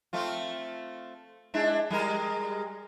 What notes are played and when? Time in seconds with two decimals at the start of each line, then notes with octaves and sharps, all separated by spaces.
0.13 A3 C4 F4
1.54 G#3 D4 E4
1.90 G3 G#3 A#4